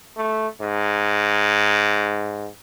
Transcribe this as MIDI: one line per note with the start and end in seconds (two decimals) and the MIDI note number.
0.17 0.47 57
0.61 2.48 44